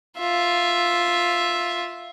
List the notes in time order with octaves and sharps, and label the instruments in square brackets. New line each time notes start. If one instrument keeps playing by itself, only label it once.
[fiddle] F4 E5